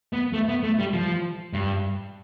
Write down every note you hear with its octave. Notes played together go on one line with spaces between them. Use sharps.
B3
A3
B3
A3
G3
F3
G2